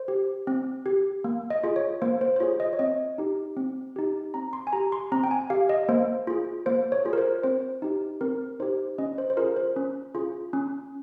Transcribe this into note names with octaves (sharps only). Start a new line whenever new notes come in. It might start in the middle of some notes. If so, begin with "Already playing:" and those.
Already playing: C5
G4
C4
G4
A#3
D#5
F4 G#4
C#5
A#3 C5
C5
C5
F4 G#4 C#5
D#5
C#5
C4 D#5
D#4 G4
C4
D#4 G4
C4 A#5
C6
G#5
G4 A#5
C6
C4 A#5
G5
G#5
G4 F5
D#5
A#3 C5
F4 G#4
A#3 C5
C#5
F4 G#4
A#4
C5
C4 C5
D#4 G4
C4 A#4
D#4 G4 C5
C#4 D#5
C5
C5
F4 G#4 A#4
C5
C#4
F4 G#4
C#4